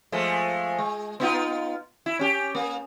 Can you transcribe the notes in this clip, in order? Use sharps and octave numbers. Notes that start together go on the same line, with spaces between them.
F3 G#3 A3
G#3
B3 D#4 F4
E4
C#4 G4
A#3